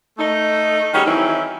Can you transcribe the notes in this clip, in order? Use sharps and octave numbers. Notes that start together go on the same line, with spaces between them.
A3 D#4
D#3 G3 C#4 D#4 F#4 G#4
D#3 E3 F#3 C4 D#4 E4